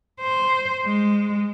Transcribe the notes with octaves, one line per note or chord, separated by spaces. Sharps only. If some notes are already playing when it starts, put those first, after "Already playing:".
C5
G#3